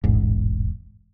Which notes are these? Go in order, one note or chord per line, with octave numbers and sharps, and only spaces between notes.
E1 A1 G#2